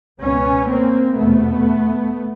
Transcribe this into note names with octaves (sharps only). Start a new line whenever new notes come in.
C#2 B2 B3 C#4
A#3 C4
F1 E2 B2 A3 B3